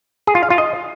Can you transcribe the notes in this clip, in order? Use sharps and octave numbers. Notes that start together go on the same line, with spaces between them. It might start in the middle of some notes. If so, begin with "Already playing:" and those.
G#4
F4
F5
F4
D#5